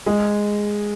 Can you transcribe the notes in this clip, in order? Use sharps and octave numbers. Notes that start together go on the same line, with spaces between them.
G#3 G#4